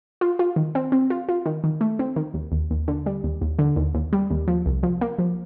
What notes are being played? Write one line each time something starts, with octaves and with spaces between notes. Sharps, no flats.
F4
F4
D#3
C4
C4
F4
F4
D#3
D#3
A3
C4
D#3
D#2
D#2
D#2
D3
G3
D#2
D#2
D3
D#2
D#2
G3
D#2
F3
C2
F3
A#3
F3